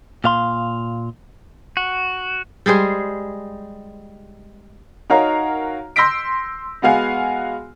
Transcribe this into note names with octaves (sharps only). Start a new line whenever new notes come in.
A#2 F5 C6
F#4
G3 G#3 G#4 C5
D#4 F#4 A#4 C#5 F5 A#5
C6 E6 G6 A#6 B6 D7
G#3 B3 F#4 F5 G#5